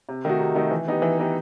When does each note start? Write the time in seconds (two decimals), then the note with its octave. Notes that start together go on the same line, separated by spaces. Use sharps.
0.09 C3
0.25 D#3 A3 D#4 F#4
0.40 C3
0.55 D#3 A3 D#4 F#4
0.71 E3
0.88 B3 D#4 G4
1.02 E3
1.18 B3 D#4 G4